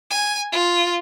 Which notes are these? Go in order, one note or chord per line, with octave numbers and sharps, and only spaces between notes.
G#5
F4